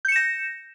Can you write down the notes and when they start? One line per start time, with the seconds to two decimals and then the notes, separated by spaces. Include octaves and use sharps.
0.05 G6
0.08 C#7
0.12 E7
0.16 A#6